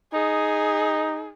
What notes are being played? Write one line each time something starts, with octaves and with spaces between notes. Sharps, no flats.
D#4 G#4